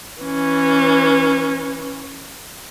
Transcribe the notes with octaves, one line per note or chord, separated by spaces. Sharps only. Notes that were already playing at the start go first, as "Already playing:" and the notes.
E3 C#4